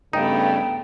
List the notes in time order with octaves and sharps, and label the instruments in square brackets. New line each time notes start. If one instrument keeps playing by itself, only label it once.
[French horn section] G2 C#3 [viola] A3 B3 [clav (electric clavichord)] D#4 [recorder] G5